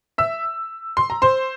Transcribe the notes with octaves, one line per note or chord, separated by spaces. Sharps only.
E5 E6
C6
A#5
C5 C6